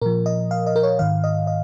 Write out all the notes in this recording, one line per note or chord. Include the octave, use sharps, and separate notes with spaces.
A#2 F3 A#4
D#5
F5
D#5
A#4
C#5
G#2 D#3 F5
D#5
D#5